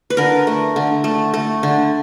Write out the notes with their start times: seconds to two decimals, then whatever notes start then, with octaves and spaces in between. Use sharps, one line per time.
0.10 B4
0.17 D3 A#4
0.47 A3
0.76 D3
1.04 A3
1.34 A3
1.63 D3